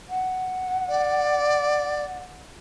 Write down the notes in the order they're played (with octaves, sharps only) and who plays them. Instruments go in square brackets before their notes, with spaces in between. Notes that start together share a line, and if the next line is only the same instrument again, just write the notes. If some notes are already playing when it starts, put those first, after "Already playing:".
[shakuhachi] F#5
[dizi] D5